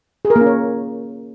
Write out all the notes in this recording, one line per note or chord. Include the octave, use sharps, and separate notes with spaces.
G#4
A#4
A#3
C#4
C#5